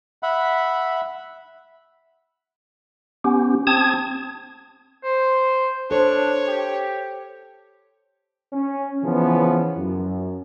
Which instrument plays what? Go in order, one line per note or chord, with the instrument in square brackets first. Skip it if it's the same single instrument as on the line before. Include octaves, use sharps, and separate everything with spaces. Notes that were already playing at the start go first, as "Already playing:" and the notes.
[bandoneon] E5 F#5 B5
[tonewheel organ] B3 C#4 G4
C4 A5 D#6 G#6
[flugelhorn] C5
[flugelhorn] D4 [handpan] A4 C5 [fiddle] C#5
[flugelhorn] G4
[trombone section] C#4
C#3 E3 F3 B3
F#2